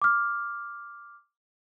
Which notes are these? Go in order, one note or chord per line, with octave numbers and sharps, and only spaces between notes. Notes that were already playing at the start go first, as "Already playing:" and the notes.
D6 F6